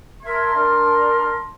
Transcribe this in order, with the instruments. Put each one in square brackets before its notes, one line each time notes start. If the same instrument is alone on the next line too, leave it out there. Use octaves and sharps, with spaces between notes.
[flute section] A#4 E5 G#6 [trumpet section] A5 C6
[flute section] D4 A#4